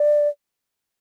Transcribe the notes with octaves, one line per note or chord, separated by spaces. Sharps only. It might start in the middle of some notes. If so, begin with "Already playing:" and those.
Already playing: D5